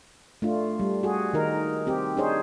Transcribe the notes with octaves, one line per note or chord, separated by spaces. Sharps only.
A3 D4 F4
G3
F#4 G#4
D#3 D#4 A#4
C4 G4
D4 D#4 G#4 C5 C#5